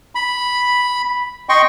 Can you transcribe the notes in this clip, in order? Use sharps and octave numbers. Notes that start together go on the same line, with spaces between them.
B5
D#5 G5 C6 C#6